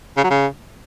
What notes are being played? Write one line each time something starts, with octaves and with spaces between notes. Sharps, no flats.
C#3
F#3
C#3